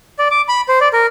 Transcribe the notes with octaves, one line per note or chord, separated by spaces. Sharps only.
D5
D6
B5
C5
D5
A#4